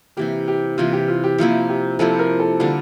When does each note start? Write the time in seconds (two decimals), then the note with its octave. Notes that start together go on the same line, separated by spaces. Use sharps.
0.17 C3 E3 A#3 G4
0.48 G4
0.78 C3 E3 A#3 F4
0.93 G4
1.08 F4
1.24 G4
1.38 C3 F3 A#3 E4 F4
1.69 G4
1.99 C3 F3 A#3 E4 A4
2.19 A#4
2.40 A4
2.60 D3 G3 A#3 F4 A4